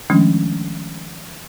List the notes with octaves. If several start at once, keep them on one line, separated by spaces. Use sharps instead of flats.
D#3 F3 G#3 A3 C#4 D4